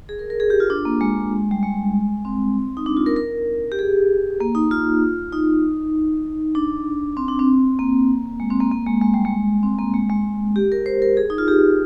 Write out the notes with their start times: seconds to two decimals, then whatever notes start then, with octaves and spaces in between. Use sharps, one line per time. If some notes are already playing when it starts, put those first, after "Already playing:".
0.09 G#4
0.19 A#4
0.30 A#4
0.40 G#4
0.50 G4
0.60 F4
0.70 D4
0.85 A#3
1.01 G#3
1.51 G3
1.63 G#3
2.25 C4
2.77 D#4
2.86 D4
2.97 F4
3.06 A#4
3.16 A#4
3.72 G4
3.79 G#4
4.40 A#3
4.55 D#4
4.71 F4
5.32 D#4
6.55 D4
7.17 C4
7.28 D4
7.39 C4
7.79 A#3
8.40 G#3
8.50 C4
8.60 A#3
8.72 A#3
8.86 G#3
9.01 G#3
9.14 G3
9.25 G#3
9.63 C4
9.78 A#3
9.94 G#3
10.10 G#3
10.56 G4
10.72 A#4
10.86 C5
11.02 A#4
11.17 G#4
11.30 D#4
11.38 F4
11.48 G4